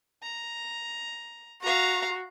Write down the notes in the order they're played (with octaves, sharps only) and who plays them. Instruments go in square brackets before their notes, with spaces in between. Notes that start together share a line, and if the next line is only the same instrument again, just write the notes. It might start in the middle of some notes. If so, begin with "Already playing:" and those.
[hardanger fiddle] A#5
[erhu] F#4 [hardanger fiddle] F5 A#5